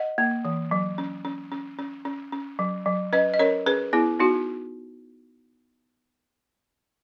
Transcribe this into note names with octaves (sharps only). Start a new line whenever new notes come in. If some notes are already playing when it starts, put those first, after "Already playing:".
Already playing: D#5 F#5
A#3
E3
F#3
C#4
C#4
C#4
C#4
C#4
C#4
F#3
F#3
C#4 B4 D#5
D#5
C#4 A#4 C#5
C#4 G#4 B4
B3 E4 G#4
B3 D#4 F#4